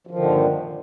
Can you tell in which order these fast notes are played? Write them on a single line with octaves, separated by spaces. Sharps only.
F3 D#3 D3 A#2 G2